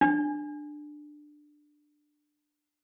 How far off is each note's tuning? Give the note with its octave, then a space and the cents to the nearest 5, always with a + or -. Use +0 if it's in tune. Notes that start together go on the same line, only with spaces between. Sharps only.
D4 +15